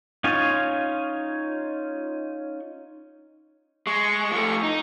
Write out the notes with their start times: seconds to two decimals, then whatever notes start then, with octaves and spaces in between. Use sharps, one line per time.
0.24 C#4 D#4 F4 C#5 G#5
3.87 G#3 C#6
4.32 F3 A3
4.63 D#4